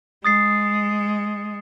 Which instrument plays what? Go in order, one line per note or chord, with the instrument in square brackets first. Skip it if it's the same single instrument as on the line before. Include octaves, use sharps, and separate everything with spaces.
[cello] G#3 [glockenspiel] D#6 A6 C7